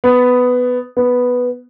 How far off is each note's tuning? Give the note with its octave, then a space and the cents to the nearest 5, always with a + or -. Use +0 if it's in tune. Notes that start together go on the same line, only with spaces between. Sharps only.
B3 +10
B3 +0